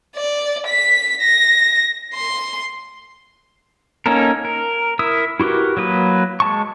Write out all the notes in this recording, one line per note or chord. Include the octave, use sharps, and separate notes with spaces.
D5
B6
A#6
C6
A#3 C#4 D#4 A4 A#4
A#4
E4 A#4 D#6 E6
E4 F#4 G4 A#4 B4
F#3 A#3 B4 D#6
G#3 A5 C#6